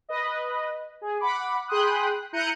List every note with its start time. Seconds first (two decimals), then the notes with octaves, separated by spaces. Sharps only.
0.09 B4 D#5
1.01 G#4
1.20 F#5 B5 D6
1.68 G#4 G5 B5 C6 D#6 F#6
2.33 E4 A#5 F#6 G6 C#7 D#7